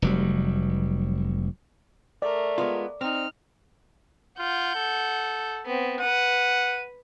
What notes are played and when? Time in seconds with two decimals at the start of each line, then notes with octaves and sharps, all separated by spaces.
0.02 F1 F#3 G3
2.22 A3 A#4 D5
2.58 G#3 B3 F4
3.01 C4 D#4 F6
4.39 F4 F#5 G6
4.75 A4
5.66 B3 C4
6.01 B4 F#5 D#7